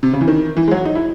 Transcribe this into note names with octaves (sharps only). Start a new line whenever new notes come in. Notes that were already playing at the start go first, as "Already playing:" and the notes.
C3
C#3
E3
D#3
E3
G#3
F#3
D#4
E4